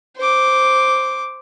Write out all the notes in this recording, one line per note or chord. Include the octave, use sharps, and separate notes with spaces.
C5 D6